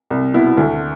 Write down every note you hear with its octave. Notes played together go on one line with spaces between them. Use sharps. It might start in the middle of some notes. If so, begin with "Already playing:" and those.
C2
B2 B3 E4
D2